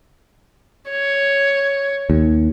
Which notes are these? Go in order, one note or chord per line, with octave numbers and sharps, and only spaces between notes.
C#5
D#2